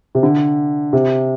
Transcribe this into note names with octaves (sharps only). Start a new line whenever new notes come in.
C3
D3
C3